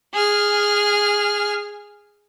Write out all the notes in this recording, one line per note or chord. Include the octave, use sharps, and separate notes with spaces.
G#4 F6